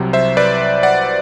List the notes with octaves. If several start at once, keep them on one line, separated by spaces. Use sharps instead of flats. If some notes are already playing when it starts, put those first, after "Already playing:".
Already playing: C2 C3 F#3
C5 E5
B4 D5
D5 F#5